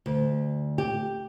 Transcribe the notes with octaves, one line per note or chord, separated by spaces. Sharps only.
D2
G4